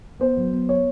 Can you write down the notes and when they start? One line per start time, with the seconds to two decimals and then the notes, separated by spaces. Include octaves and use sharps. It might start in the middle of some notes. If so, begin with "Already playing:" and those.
0.20 B3 C5
0.37 F#3
0.52 B3
0.69 C#5